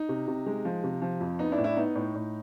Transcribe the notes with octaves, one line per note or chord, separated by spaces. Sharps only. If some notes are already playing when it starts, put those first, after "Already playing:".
Already playing: D#4
C3
C3
G#3
F3
C3
F3
F2
B3 D#4
D4 E4
A2
D4 E4
B3 D#4
A2
A2